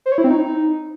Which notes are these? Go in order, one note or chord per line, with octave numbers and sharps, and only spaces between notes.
C5
C#5
E4
C4
D#4